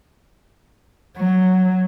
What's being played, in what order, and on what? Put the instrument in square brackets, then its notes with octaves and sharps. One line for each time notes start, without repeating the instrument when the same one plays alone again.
[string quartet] F#3